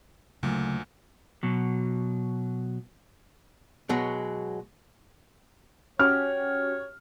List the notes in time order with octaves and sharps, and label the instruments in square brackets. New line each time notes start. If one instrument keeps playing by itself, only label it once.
[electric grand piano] D2 A#2 [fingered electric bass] C#3 F#3 A3
[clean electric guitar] B2 F#3
[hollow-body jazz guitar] B2 F#3 G#3
[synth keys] C#4 F#4 G4 [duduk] C#5 [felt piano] F6